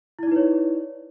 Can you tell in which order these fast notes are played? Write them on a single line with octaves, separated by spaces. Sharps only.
E4 D5 D#4 B4 C#5